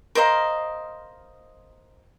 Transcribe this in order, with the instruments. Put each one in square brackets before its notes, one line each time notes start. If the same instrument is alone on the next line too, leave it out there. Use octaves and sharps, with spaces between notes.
[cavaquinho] A#4 C5 D#5 F5